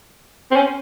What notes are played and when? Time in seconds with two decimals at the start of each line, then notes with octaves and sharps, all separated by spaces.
0.51 C4
0.56 C#4